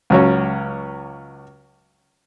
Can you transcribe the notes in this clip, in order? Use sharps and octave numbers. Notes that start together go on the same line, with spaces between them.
C#2 F#3 C#4